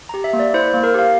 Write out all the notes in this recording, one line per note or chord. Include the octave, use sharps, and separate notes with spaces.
G4 A#5
E5
A#3
D5
E4 C5
C5
A#3
A#4
G4 F5